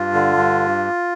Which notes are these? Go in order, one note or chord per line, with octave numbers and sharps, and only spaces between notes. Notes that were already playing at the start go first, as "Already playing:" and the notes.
Already playing: G2 F4
D3
G2